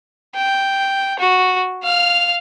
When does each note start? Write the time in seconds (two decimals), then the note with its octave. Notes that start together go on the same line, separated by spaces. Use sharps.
0.35 G5
1.19 F#4
1.83 F5 F6